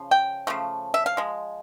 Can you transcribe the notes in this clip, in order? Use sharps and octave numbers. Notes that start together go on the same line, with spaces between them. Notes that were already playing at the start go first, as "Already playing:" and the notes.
Already playing: C#3 F3
G5
C#3 F3 A3
E5
F5
F3 G#3